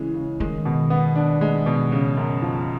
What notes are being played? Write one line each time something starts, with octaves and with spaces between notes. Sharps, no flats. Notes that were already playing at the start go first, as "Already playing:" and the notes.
Already playing: C#3 E3 G#3
C#3
D#3 G#3
B2
B3
D4
G#3
B2
C#3
F#2
F3